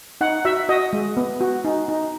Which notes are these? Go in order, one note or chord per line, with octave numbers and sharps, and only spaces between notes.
D#4 F#5
F#4 E5
F#4 D#5
G#3
B3
F#4
D#4
D#4